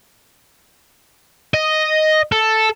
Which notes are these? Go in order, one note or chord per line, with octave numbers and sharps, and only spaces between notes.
D#5
A4